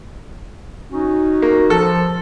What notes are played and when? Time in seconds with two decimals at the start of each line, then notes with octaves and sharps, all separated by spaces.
0.92 C#4 D#4 F#4
1.42 A#3
1.70 F3 A4